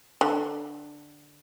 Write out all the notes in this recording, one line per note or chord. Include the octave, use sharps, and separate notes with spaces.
D3